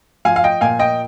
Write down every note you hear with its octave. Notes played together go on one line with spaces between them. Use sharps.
F3 F5 G#5
F5
D#5 G5
A#2 F5 G#5
D#5 G5